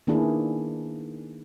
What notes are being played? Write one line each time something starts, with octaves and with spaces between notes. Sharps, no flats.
D#3 A#3 B3 D4 E4 G#4